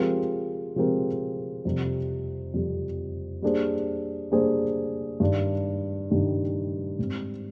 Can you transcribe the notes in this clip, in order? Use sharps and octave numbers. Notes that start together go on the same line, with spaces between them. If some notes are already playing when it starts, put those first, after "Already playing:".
Already playing: F3 G#3 C4 G4 A#4
F3 G#3 C4 G4 A#4
F2 C3 G3 C4
F2 C3 G3 C4
G3 A#3 D4 G#4 C5
G3 A#3 D4 G#4 C5
G2 D#3 G3 D4
G2 D#3 G3 D4
G#2 G3 C4